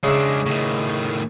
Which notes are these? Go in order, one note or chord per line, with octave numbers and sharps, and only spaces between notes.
C#3 G#3 D4 E5
A2 D#3